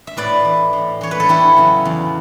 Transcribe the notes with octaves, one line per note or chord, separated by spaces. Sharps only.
E5
A2 B4 D5
E3
A2
E3 C#5
B4
A4
E2 E4 G4
C#3 F#3
E2